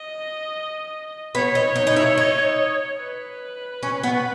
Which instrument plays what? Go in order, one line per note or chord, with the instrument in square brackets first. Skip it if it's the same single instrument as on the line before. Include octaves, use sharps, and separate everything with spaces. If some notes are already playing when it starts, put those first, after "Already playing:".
Already playing: [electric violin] D#5
[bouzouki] B3 [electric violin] C#5
[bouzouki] D#4
D#4
D#4
E4
D#4
[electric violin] B4
[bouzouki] C#4
B3